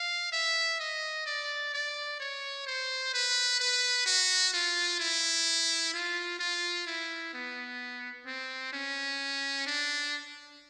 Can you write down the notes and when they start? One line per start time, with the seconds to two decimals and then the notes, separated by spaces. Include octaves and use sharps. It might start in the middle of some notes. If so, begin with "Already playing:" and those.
Already playing: F5
0.32 E5
0.80 D#5
1.26 D5
1.74 D5
2.20 C#5
2.66 C5
3.14 B4
3.60 B4
4.06 F#4
4.53 F4
5.00 E4
5.94 F4
6.39 F4
6.87 E4
7.34 B3
8.26 C4
8.73 C#4
9.66 D4